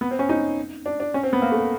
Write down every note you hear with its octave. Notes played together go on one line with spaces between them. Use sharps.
B3
C4
C#4
D#4
D4
D4
C#4
C4
B3
A#3
A3